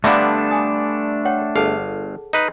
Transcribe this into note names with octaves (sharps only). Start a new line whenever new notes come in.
D3 G3 A3 B3 D4 E5 F5
G#5 D#6
C#5 F#5 G5
G1 G#4 A4 F5 A5
D#4 B4 D#5